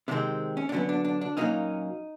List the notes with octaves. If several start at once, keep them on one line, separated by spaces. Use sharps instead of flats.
C3 D#3 G#3 C4 D4
C#4
D4
D3 F#3 B3 C#4
D4
D4
D4
A#2 F#3 A#3 C#4 D#4